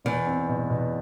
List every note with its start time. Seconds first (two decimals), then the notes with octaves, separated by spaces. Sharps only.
0.05 E2 B2
0.27 C4
0.49 B2
0.70 B2